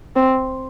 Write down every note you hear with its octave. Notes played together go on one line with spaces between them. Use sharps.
C4